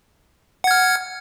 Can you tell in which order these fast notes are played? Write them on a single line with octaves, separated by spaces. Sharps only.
F#5 G#6 F6